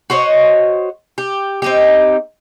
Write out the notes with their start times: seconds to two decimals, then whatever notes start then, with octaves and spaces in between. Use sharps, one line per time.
0.10 F#4 C5 C#5 D#5
1.18 G4
1.62 C4 D#4 G4